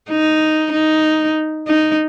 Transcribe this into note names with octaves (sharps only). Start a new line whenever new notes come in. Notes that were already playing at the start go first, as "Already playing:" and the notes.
D#4
D#4
D#4